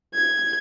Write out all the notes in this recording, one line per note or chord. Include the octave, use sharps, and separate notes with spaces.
G#6